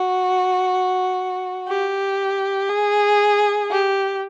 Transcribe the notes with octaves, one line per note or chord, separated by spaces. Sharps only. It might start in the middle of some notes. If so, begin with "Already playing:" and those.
Already playing: F#4
G4
G#4
G4